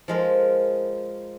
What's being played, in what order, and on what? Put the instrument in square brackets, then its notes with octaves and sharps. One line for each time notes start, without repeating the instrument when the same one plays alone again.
[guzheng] F3 G#3 A#4